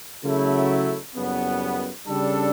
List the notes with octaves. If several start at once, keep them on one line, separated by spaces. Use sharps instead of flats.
C#3 F#3 A3 E4
F#1 F#2 C#3 G3 B3
C#3 G3 D4 A4